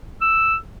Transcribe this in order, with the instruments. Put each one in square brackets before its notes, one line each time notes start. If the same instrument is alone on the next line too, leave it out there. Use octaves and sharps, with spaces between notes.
[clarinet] E6